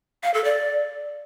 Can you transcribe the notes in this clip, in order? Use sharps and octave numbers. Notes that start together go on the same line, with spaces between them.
F5
A4
D5